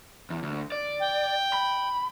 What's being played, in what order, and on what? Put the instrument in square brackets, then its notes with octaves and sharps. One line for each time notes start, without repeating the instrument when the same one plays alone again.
[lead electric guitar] E2
D2
D5
[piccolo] G5
[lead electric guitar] B5